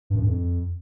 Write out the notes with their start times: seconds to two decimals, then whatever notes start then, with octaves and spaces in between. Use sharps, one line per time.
0.10 G2
0.16 F#2
0.21 G2
0.26 F2